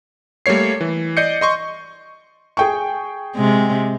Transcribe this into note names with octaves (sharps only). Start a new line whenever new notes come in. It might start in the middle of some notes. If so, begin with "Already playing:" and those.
G3 A3 A#3 C#5 C7
E3
D5 D#5 G6 C7 C#7
D#5 C6 C#6
G#4 G5 C#6
C3 G#3